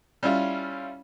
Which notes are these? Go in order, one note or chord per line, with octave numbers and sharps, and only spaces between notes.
G3 C#4 E4 F4